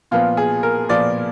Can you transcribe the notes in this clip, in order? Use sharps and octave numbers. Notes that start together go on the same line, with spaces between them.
A#2 F3 B3 F4
G#4
A#4
A#2 F3 B3 D5